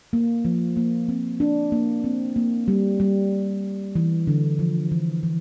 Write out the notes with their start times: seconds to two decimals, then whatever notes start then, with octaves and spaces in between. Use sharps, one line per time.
0.13 A#3
0.45 F3
0.76 A#3
1.09 C4
1.40 D4
1.72 A#3
2.04 C4
2.36 A#3
2.68 G3
3.00 G3
3.95 E3
4.27 D3
4.59 F3
4.92 E3
5.23 E3